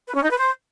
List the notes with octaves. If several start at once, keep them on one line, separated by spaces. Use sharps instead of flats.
B4
C#4
D#4
B4
C5